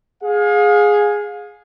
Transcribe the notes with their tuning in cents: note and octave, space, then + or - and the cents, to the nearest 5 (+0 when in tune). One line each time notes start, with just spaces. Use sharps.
G#4 +0 F5 +35